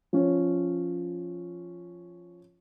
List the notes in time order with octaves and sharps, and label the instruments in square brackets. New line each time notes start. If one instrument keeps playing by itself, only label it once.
[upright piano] F3 C#4